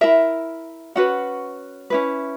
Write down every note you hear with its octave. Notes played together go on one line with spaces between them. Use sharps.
E4 A#4 E5
C#4 F#4 B4 F#5
C#4 E4 B4